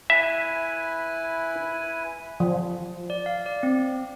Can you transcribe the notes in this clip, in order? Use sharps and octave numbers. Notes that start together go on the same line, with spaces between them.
E4 B4 E5 G#5
F3
D5
F5
D5
C4